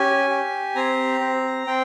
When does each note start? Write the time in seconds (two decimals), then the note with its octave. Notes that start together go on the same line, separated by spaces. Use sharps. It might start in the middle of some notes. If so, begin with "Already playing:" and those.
Already playing: C#4 G4 G#5
0.30 G4
0.75 C4 A#5
1.21 C4
1.67 C4 G5